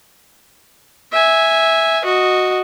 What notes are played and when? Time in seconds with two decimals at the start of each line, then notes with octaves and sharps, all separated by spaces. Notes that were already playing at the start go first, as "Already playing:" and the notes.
1.12 E5 G#5
2.05 F#4 D#5